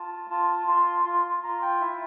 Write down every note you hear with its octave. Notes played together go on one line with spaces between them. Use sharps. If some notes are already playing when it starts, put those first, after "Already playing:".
Already playing: F4 A5
F4 A5
F4 C6
F4 C6
C6
F4 A#5
G5
E4 E5